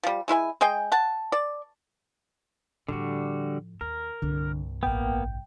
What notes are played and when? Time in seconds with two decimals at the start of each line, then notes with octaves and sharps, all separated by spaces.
0.03 F3 G3
0.28 G#3 E4 B4 G#5
0.61 G#3 G#4 D#5 G5
0.92 F#5 A5
1.32 D5
2.88 A2 D3 F3 G3 F#4
3.81 D#2 A#4
4.22 C2 G2 D3
4.83 A1 A#3 B3 G5